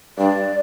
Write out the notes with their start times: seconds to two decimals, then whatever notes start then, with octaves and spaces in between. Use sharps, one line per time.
0.18 G2 D5